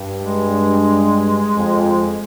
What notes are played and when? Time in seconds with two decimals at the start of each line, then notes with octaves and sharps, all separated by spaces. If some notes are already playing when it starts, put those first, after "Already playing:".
Already playing: G2
0.21 G#3
1.56 F2